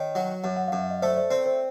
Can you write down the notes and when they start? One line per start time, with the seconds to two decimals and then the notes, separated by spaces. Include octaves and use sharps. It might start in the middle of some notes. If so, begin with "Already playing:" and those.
Already playing: D#3 C#5
0.15 F#3
0.44 F#2
0.57 F#5
0.68 F#2 F5
0.79 E5
0.90 D#5
1.02 A3 C5 D5
1.17 C5 D5
1.31 C4 C5 D5
1.46 C5